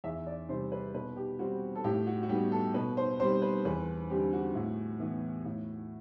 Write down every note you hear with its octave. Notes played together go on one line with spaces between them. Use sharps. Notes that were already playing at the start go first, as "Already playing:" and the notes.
E2 E5
D5
C3 G3 C5
B4
B2 B4
G4
G3 C4 F#4
A4
A2 G4
F#4
F#4
G3 B3 G4
A4
B2 B4
C5
G3 C4 C5
B4
E2 B4
D3 G3 C4 G4
F#4
A2
E3 B3
A2